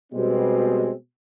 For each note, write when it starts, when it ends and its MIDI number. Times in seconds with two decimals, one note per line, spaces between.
0.13 0.91 47
0.13 0.91 55
0.13 0.91 56
0.13 0.91 60